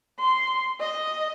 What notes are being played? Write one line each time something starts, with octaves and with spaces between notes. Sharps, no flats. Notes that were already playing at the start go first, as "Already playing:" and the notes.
C6
D#5